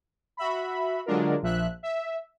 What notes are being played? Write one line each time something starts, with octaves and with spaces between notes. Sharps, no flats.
F#4 E5 B5
D3 F#3 G#3 D4 F4 A#4
A#1 F3 E5 F#6
E5